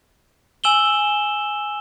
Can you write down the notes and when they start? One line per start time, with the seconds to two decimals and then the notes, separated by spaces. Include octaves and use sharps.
0.64 G#5 E6 E7 F#7 G7